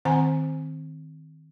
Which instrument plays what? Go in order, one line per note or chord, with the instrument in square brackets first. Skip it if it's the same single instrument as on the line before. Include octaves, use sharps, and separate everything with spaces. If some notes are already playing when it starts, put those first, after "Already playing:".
[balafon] D#3 C4 C5 F#5 G#5 A#5